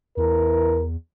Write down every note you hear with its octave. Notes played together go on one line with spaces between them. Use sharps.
E2 E3 A#4